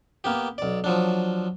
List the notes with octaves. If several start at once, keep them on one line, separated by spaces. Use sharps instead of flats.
A#3 B3 G4
B1 D5
F3 F#3 D4